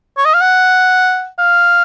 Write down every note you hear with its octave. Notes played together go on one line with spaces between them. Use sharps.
C#5
D#5
F5
F#5
F5